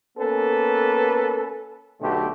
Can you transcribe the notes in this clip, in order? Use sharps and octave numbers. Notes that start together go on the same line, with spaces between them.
A#3 B3 C#4 A4 B4
B1 B2 D3 A3 G4